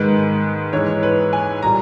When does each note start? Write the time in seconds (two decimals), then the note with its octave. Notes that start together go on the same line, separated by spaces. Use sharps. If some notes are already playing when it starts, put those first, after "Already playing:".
Already playing: G#2 D#3 G#3 B4
0.73 G#2 E3 G#3 C#5
1.03 B4
1.33 G#5
1.62 A#2 G3 A#5